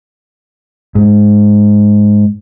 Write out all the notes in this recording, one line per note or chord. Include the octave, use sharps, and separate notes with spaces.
G#2